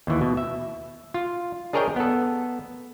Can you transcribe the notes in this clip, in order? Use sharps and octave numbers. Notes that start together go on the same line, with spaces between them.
D#2 E3
B2
E5
F4
D4 G#4 A#4 C#5 D#5 G5
B3 A4